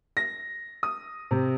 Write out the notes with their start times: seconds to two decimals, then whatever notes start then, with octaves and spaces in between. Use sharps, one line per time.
0.17 A#6
0.83 D#6
1.31 C3